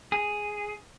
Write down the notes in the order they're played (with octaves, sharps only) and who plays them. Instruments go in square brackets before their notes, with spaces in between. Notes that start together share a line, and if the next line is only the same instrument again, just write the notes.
[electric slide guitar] G#4